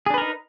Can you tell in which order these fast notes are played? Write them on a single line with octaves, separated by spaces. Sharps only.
G#4 D4 B4 A#4 D#4